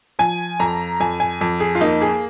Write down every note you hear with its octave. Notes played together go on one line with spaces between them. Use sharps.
F3 G#5
F2 A#5
F2 G#5
G#5
F2
G#4
F4
A#3 D#4
G#4